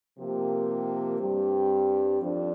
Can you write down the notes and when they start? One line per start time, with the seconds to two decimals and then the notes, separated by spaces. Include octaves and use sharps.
0.18 C3 F3 A#3 G4 A#4
1.20 G2 G3 C4 G4
2.21 F2 F3 D4